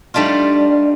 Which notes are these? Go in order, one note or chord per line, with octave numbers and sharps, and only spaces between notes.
G3 A3 D4 D#4 F4